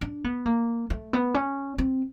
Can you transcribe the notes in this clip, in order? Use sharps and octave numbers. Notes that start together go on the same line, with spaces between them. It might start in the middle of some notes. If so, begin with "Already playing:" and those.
D4
B3
A#3
A3
B3
C#4
C4